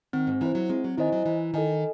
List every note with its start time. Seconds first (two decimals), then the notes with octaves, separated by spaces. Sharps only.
0.13 D#3 C4
0.27 G#2
0.41 E3 E4 C5
0.55 F#3
0.70 G#3 C4
0.84 F#3
0.98 D#3 E4 C5 D#5 G#5
1.12 F#3
1.26 E3 E4
1.54 D#3 A4 D#5 G#5